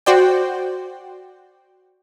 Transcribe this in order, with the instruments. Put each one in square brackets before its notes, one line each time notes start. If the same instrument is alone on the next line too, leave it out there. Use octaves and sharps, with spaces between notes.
[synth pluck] F#4 C5 D5 G5